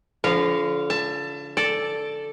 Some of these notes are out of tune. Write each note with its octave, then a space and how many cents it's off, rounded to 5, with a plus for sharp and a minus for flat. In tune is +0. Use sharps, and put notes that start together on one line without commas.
D3 -40 F3 -10 F5 -10
E5 +35 A5 +15
A4 +0 D5 +0